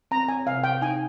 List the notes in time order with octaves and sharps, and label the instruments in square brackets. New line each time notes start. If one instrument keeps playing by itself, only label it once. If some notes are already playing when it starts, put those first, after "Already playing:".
[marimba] C4 [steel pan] A#5
[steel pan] G#5
[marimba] C3 [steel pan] F5
[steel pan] G5
[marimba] D#4 [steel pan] G#5